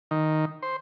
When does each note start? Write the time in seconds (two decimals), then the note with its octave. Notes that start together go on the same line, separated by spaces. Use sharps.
0.11 D#3
0.62 C5